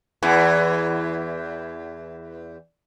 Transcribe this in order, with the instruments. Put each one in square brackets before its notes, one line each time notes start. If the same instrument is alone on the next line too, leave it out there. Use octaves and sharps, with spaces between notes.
[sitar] E2 E3